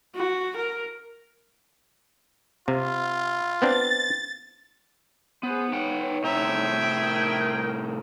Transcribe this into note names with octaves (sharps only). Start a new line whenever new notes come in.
F#4
A#4
C3 F4
B3 C4 D4 A6
B3 G#4 C5
D#4 B4 C#5 F#5 G5
A2 C3 G#4 E5 G5 A#5
A#4